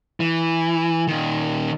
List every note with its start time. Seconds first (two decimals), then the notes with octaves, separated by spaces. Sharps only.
0.20 E3
1.08 A#2 D#3